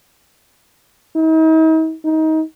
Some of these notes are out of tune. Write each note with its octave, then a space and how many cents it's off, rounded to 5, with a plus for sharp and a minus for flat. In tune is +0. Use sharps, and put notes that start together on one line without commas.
D#4 +40
D#4 +25